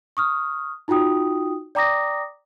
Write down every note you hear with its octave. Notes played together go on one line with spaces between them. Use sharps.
C#6 D#6 F6
D#4 F4 F#4 G5 D#6
D5 G5 A#5 D6 D#6 A#6